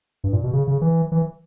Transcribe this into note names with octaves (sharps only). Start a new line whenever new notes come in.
G2
A#2
B2
C#3
C#3
E3
E3